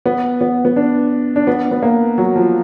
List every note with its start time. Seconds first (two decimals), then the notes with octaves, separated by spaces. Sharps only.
0.06 B3
0.41 B3
0.65 B3
0.76 D4
1.36 D4
1.47 B3
1.71 B3
1.83 A#3
2.18 F#3
2.36 F3